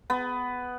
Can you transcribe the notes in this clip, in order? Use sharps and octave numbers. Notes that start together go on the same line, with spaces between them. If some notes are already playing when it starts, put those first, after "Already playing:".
B3